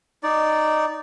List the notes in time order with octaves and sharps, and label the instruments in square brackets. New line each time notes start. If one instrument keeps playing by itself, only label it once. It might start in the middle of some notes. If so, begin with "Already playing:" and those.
[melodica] D#4 D5